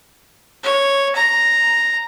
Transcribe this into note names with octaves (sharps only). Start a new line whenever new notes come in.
C#5
A#5